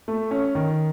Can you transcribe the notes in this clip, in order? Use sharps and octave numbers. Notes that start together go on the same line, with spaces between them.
A3
C#4
D#3